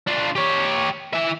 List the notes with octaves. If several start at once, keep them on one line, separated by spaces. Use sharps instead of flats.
D4 F4
G4 C#5
E3 E5